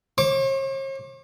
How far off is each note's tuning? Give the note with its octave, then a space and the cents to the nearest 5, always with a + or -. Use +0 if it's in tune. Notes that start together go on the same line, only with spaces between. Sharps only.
C#5 -45 D6 +0